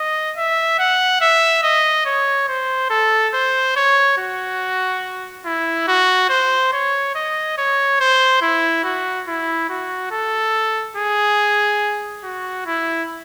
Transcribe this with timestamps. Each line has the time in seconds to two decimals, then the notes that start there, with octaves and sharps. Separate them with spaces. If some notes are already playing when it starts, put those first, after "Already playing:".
Already playing: D#5
0.37 E5
0.79 F#5
1.21 E5
1.63 D#5
2.06 C#5
2.48 C5
2.90 A4
3.34 C5
3.76 C#5
4.18 F#4
5.45 E4
5.88 F#4
6.29 C5
6.72 C#5
7.15 D#5
7.58 C#5
8.00 C5
8.41 E4
8.84 F#4
9.27 E4
9.69 F#4
10.11 A4
10.97 G#4
12.24 F#4
12.66 E4